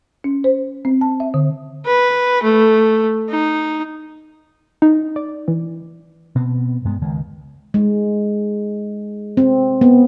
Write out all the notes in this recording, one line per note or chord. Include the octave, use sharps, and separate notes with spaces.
C#4
C5
C4
A5
E5
D3
B4
A3
D#4
D#4
D5
E3
B2 B3 C4
G2 G#3 A#3 B3
C#2 D#3 G#3
G#3
C4
B3